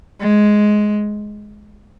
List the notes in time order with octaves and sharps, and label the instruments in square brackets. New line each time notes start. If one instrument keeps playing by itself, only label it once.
[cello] G#3